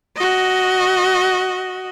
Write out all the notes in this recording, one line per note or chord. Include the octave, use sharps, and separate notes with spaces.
F#4 D#5